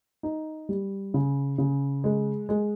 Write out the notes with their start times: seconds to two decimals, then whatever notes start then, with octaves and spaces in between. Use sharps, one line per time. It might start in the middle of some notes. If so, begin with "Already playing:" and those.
0.23 D#4
0.69 G3
1.14 C#3
1.58 C#3
2.04 G#3
2.49 G#3